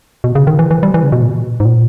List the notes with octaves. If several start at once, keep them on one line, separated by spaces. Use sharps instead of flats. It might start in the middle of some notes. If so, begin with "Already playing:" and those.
B2
C#3
D#3
E3
E3
G3
E3
C#3
B2
A#2
G#2
A#2